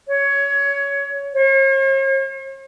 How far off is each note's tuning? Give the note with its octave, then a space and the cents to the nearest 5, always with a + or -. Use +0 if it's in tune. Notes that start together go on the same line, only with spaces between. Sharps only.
C#5 +15
C#5 -45